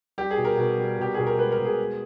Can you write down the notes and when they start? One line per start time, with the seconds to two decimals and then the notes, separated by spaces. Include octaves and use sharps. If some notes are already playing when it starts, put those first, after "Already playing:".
0.18 G3 G4
0.31 G#4
0.37 B2
0.45 A#4
0.58 B2
0.78 G3
0.99 B2 G4
1.14 B2 G#4
1.27 A#4
1.38 G#3 B4
1.52 A#4
1.58 B2
1.66 G#4
1.78 G#3